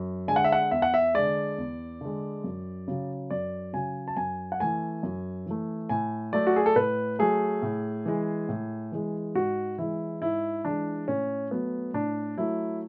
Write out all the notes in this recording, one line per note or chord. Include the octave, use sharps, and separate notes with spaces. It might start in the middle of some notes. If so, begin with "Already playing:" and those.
Already playing: F#2
D3 G#3 G#5
F#5
E5
F#5
E2 E5
F#5
E5
D3 G#3 D5
E2
D3 G#3
F#2
C#3 F#3
F#2 D5
C#3 F#3 G#5
A5
F#2 G#5
F#5
E3 A3 G#5
F#2
E3 A3
A2 G#5
F#3 A3 D5
F#4
G#4
A4
A2 B4
F#3 A3 G#4
A2
E3 G#3
A2
E3 G#3
G#2 F#4
E3 G#3 E4
G#2 E4
E3 G#3 D4
A2 C#4
F#3 A3 B3
A2 D4
F#3 A3 E4